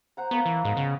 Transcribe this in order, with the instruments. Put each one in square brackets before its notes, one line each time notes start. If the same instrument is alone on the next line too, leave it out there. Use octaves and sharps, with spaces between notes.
[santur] C5 F#5 A#5
[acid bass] B3 [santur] A#4 F5 C#6
[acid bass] E3
[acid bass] G#2 [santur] G#3 B3
[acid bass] C#3